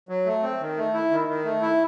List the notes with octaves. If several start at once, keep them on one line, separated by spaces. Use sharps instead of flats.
F#3
A3
C4
D#3
A3
E4
D#3
D#3
A3
E4